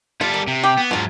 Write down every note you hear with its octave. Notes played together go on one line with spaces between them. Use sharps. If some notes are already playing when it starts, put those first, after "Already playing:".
G3 F4 A4
A#3
C3
G4
B3
G#2 F3 F#3 F4